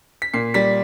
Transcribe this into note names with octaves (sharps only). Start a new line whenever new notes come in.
B6
A#2 C7
G3 B6